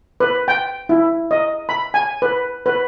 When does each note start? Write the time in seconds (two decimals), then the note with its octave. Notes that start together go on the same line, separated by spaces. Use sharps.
0.20 B4
0.48 G5
0.89 E4
1.31 D#5
1.69 B5
1.94 G#5
2.22 B4
2.66 B4